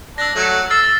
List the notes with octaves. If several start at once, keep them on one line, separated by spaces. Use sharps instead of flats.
D4 E6 A#6
F#3 A3
E6 F6 A6 C7